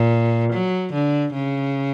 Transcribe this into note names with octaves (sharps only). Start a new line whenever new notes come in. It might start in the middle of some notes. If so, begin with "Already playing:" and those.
Already playing: A#2
F#3
D3
C#3